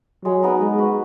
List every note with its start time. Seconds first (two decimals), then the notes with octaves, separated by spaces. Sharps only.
0.25 F#3 G#3
0.43 B3 D#4 A#4
0.61 G#3 D#4
0.78 F#4 B4